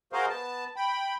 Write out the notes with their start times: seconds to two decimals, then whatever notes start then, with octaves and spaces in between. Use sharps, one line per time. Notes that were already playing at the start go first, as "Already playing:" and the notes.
0.13 F#4 G#4 A#4 C5 D#5 F5
0.29 B3 A5
0.76 G5 B5